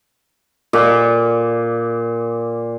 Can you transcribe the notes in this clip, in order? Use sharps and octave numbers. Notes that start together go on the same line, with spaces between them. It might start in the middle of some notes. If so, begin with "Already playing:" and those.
A#2 D6